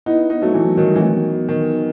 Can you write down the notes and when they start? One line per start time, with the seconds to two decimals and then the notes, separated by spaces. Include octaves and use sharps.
0.06 B3 D#4 E4
0.30 B3 D#4
0.42 F#3 A3
0.54 E3 E4
0.65 F#3
0.77 D#3 F#3 G3
0.90 G3
0.96 E3
1.01 D#3 F#3 A3
1.16 B3
1.32 B3
1.48 D#3